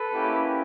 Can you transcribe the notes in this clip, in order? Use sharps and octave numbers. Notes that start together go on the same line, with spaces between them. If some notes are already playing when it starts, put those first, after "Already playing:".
Already playing: A4 B4
A#3 C#4 E4 G4